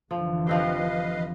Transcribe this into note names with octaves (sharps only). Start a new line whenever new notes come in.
F1 D3 E3 F3
F3 C4 G4 B4 D#5 F5